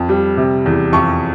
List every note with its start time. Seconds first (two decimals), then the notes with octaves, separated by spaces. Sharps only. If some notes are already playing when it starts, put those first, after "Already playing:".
Already playing: F2
0.09 G3
0.37 C3
0.66 E2
0.93 F2 C#6